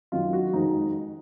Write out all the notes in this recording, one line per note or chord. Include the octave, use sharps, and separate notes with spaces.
F#2 D#3 F#3 F4
F#4
F2 D#3 G#3 D#4